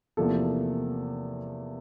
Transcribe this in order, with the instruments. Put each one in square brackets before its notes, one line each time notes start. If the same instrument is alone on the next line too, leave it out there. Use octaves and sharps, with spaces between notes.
[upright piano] E2 C3 F3 A#3 A4